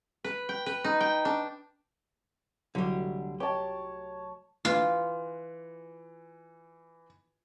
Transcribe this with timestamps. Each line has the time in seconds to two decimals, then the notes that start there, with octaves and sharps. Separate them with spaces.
0.24 B4
0.49 G5
0.66 B4
0.84 D#4
1.01 G5
1.25 D4
2.75 C2 D3 F#3 G3 A3
3.40 G4 C#5 A5
4.65 E3 F4